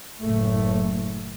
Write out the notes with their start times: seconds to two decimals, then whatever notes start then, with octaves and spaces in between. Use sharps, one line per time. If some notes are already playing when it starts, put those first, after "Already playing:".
0.21 F#1 A2 A3